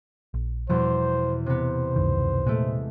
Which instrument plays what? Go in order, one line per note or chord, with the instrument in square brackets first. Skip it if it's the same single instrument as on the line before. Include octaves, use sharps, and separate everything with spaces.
[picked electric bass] A#1
[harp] E2 B2 [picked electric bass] F3 G3 [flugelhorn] C5
[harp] C3 B3 [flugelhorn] C5
[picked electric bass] C#2 F#2 D#3
[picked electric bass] A#2 [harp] G#3 A3